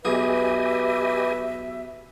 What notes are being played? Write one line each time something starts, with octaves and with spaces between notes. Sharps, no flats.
B1 G4 G#4 B4 D#5 E5 G#5